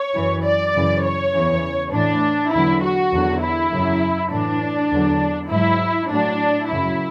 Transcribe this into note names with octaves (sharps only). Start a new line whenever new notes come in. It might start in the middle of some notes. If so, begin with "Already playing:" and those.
Already playing: C#5
F#2 E3
D5
F#2 C#3 E3
C#5
E2 C#3 E3
A2 E3 D4
E2 D3 F#3 E4
F#4
E2 D3 F#3
E4
F#2 C#3 F#3
A2 E3 D4
E2 D3 F#3
G#2 F#3 E4
A2 F#3 D4
F#2 C#3 F#3 E4